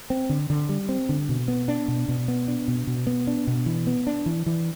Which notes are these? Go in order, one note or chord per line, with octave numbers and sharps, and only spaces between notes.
C4
D3
D3
G3
C4
D3
B2
B3
D4
B2
B2
B3
D4
B2
B2
B3
D4
B2
E3
B3
D4
E3
E3